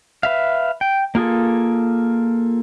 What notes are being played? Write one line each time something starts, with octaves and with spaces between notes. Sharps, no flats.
B4 E5 F5
G5
A#3 F4 G#4 A4